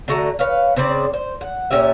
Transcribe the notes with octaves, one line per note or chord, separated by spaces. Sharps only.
D3 A3 F#4 A#5
B4 C#5 F5
C#3 C4 C5 D5
C5
F#5
A#2 C#4 G4 E5